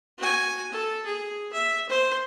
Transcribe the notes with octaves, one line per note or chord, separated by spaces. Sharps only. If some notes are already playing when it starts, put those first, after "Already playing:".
F#4 G#5
A4
G#4
E5
C5